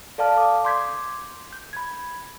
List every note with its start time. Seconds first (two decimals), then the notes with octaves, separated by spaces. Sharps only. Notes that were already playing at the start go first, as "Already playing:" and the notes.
0.18 A4 D5 F5 A5 F6
0.37 D6 D#6
0.65 C6 D6 G6 G#6 B6
1.53 G6
1.73 B5 G#6